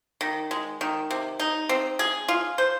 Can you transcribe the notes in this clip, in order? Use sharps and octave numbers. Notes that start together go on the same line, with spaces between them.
D#3
G#3
D#3
C3
D#4
C4
G#4
F4
C5